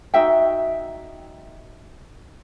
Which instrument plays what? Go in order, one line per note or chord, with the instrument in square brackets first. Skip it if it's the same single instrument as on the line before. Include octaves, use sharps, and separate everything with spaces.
[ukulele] D#4 F#4 E5 G5